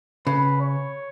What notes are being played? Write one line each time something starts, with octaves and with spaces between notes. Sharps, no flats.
C#3 B4
C#5